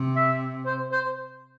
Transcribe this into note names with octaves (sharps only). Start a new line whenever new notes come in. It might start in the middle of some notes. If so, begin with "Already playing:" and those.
Already playing: C3
E5
C5
C5